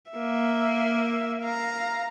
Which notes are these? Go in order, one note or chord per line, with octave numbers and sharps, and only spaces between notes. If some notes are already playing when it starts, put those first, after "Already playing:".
A#3 E5
F5 A#5